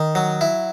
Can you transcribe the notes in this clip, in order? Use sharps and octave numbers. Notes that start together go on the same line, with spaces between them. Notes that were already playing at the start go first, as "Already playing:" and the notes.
Already playing: D#3
F#3
E4